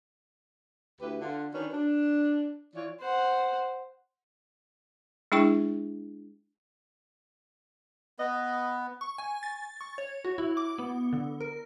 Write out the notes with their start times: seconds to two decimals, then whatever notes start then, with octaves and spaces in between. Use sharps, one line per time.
1.01 D2 E4 G4 B4
1.21 D3 F4
1.53 D#3 C#4 D4 F#4 B4
1.73 D4
2.75 E3 F4 C#5 D5
3.00 C5 F#5
5.32 G#3 D4 E4 G#4 G5 C#6
8.19 B3 B4 D#5
9.01 C#6
9.18 G#5
9.43 A6
9.81 C#6
9.98 C#5
10.25 F#4
10.38 E4
10.57 D6
10.78 B3
11.13 D3
11.41 A#4